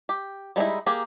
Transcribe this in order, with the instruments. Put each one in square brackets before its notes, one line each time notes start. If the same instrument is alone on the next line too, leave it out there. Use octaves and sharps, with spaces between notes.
[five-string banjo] G4
G3 G#3 C#4 D#4 E4
A#3 G4 G#4